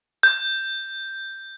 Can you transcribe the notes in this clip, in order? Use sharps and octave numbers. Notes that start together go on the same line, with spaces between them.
G6